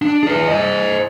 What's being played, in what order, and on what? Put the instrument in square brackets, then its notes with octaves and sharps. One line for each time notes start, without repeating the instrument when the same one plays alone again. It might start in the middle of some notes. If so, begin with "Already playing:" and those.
[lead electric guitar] D4
G#4 B4
C5 D#5